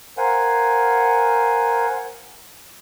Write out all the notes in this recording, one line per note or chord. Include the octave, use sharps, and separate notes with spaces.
A#4 C5 F5 F#5 G#5